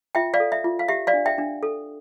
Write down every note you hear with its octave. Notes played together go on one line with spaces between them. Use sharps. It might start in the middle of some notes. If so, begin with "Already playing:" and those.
F4 E5 G5
D5 F5
A4
E5
F4
F5
G4 E5
D5 F5
D4
E5 G5
D4
A4